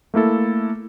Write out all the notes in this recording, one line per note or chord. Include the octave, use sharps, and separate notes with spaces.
A3 A#3 E4 A4